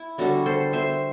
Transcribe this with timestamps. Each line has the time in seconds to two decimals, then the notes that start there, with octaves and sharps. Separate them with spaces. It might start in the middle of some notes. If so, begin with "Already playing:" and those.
Already playing: E4
0.18 D3 G3 D4 F#4 A4
0.46 A4 C5
0.73 C5 E5